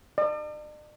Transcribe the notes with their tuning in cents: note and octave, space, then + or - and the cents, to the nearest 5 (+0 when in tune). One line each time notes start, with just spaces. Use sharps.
D5 +45